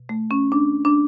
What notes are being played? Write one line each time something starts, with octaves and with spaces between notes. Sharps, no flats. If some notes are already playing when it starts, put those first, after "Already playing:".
Already playing: B2
A3
C#4
D4
D4